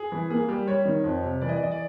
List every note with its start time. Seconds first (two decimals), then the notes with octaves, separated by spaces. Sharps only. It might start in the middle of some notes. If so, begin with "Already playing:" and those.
Already playing: G#4
0.12 E3
0.30 A#3 G#4
0.48 G3 G4
0.67 G3 C#5
0.85 D#3
1.04 F2
1.23 C3
1.41 E3 D5
1.49 D#5
1.56 D5
1.60 E3 D#5
1.71 D5